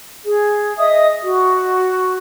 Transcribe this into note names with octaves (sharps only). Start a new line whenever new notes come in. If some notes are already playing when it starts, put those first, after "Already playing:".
G#4
D#5 E5 D#6
F#4